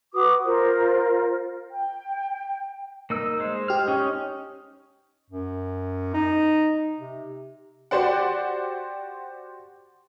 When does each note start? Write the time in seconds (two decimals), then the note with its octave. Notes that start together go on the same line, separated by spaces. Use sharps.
0.14 F#4 B4 D6 D#6
0.44 F4 A#4 C5
1.71 G5
3.10 A#3 D#4 E6
3.40 G#3 C5
3.68 G4 F6
3.88 C#4 D#4
5.30 F#2
6.14 D#4
7.00 C3
7.91 F#4 G4 C5 D5 F#5